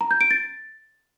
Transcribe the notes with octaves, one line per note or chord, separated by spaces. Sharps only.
A#5
G6
D7
A6